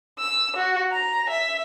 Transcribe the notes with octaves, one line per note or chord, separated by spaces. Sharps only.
E6
F#4
A#5
E5